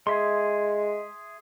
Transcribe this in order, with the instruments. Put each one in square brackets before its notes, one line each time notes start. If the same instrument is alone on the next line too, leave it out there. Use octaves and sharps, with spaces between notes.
[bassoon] G#3 [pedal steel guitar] G#4 E5 C6